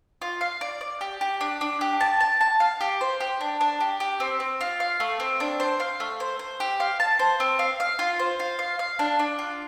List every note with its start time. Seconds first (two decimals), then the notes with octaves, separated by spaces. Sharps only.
0.22 F4
0.41 F5
0.61 D5
0.81 D5
1.01 G4
1.21 G4
1.41 D4
1.61 D4
1.81 G4
2.01 A5
2.20 A5
2.41 A5
2.60 F5
2.81 G4
3.01 C5
3.20 G4
3.41 D4
3.61 D4
3.80 G4
4.00 G4
4.20 C4
4.40 C4
4.61 F4
4.80 F5
5.00 A3
5.20 C4
5.40 D4
5.60 C5
5.80 F5
6.00 A3
6.20 C5
6.39 C5
6.60 G4
6.80 F5
7.00 A5
7.19 C5
7.40 C4
7.59 F5
7.80 F5
7.99 F4
8.19 C5
8.40 F4
8.59 F5
8.79 F5
8.99 D4
9.19 D4
9.39 F4